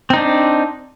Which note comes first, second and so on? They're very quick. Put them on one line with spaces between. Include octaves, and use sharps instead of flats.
C4 D#4 D4